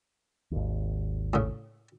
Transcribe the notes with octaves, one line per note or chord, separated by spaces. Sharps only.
G#1 D#2
A2 C#3